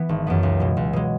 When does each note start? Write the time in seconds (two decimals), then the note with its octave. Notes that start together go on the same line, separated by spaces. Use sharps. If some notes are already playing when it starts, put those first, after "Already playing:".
Already playing: E3 B3
0.09 G#1
0.27 F#2 E3 B3
0.43 C#2
0.60 B2 G#3
0.77 C#2
0.93 B2 G#3